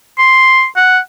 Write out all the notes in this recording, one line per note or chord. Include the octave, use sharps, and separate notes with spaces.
C6
F#5